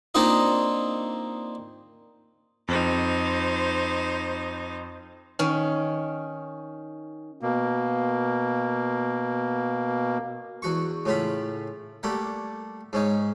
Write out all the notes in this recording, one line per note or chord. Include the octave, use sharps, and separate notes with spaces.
A#3 C4 D4 D#4 F4 D#5
F2 D#4 C5
D#3 C#4
B2 A#3
E2 F#4 C#6
A2 C#3 F4 B5
G3 A3 A#3 F#5
G#2 C#4 D#4